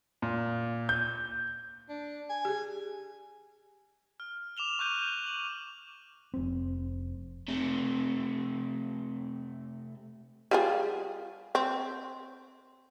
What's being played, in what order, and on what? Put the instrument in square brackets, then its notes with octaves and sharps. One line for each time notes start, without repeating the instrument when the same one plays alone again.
[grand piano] A#2
G6
[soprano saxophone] D4
G#5
[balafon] G4 G#4
[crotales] F6
D6 E7 F7 G7
C#6 F#6 G6 D#7
F#7
[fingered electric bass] F1 C4
[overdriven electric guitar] C3 A3
[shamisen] G3 F4 G#4
C4